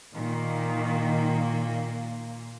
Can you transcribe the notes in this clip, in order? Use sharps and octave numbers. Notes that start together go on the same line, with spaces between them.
A#2 D#3 A#3